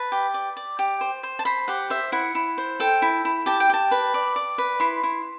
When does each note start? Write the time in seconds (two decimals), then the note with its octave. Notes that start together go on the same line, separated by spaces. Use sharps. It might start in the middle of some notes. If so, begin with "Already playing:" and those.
Already playing: B4 A5
0.12 G4
0.34 D5
0.57 D5
0.79 G4
1.01 C5
1.23 C5
1.39 A5
1.45 C5 B5
1.68 G4 F#5
1.90 C5 E5
2.12 E4 F#5
2.35 E4
2.58 C5
2.80 A4 G5
3.02 E4
3.25 E4
3.46 G4 A5
3.60 G5
3.69 G4 A5
3.91 B4
4.14 D5
4.36 D5
4.58 B4
4.80 E4 C6
5.03 E4